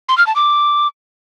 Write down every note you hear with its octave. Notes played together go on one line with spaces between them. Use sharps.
C6
F6
A5
D6